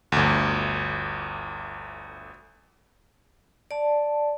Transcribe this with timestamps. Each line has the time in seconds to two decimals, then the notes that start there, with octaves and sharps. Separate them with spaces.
0.12 G1 D2
3.71 D5 A5